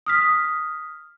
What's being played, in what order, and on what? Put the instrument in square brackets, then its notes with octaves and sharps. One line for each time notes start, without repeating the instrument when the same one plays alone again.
[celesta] D#6 F6 B6